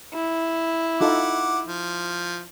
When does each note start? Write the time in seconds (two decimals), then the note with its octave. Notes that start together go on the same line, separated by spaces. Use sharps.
0.13 E4
1.01 D#4 F4 A4 F#5 D6
1.67 F3